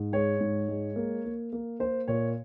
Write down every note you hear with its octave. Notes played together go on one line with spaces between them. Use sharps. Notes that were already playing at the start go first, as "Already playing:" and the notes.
Already playing: G#2
G#3 C#5
G#2
G#3
A#3
A#3
A#3
A#3 C5
A#2 C#5